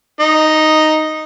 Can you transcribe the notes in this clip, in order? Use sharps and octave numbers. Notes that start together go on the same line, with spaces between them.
D#4